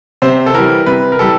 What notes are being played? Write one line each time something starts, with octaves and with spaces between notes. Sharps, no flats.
C3 C5
A4
E3 G3 A#4
C3 B4
A#4
E3 G3 A4